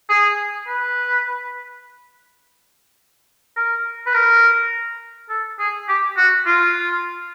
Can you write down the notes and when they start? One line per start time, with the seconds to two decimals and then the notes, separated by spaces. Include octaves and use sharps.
0.09 G#4
0.68 B4
3.56 A#4
4.06 B4
4.14 A#4
5.30 A4
5.59 G#4
5.88 G4
6.17 F#4
6.46 F4